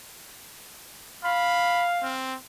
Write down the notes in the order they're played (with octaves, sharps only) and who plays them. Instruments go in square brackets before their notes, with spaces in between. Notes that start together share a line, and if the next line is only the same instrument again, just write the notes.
[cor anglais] F5 [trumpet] B5
[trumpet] C4